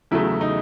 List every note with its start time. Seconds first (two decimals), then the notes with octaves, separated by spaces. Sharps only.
0.11 E2 C#3 F#3 A3 E4
0.41 D#4